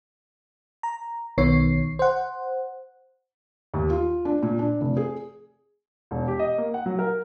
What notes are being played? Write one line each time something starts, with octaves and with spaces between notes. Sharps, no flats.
A#5
B1 D#3 B3 C#5 C7
C5 F#5
D#2
F4
D4
A#2
D4
F1
G#4
E1
G4
D#5
A#3
F#5
F#3
A#4